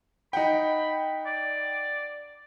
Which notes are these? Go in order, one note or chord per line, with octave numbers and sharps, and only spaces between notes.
D#4 F#5 G5 B5
D5